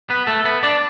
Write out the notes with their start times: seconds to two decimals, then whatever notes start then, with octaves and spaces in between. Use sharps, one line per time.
0.10 B3 B4
0.27 A3 A4
0.45 B3 B4
0.63 D4 D5